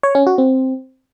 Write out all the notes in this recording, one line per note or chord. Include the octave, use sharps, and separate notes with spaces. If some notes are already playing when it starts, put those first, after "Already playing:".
C#5
C#4
F#4
C4